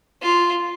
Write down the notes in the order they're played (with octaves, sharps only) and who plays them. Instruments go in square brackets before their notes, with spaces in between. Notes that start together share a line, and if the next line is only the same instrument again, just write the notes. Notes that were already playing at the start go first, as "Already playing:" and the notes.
[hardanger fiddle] F4